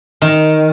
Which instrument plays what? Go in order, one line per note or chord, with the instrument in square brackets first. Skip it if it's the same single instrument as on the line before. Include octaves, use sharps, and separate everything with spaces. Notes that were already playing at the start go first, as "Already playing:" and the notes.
[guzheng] D#3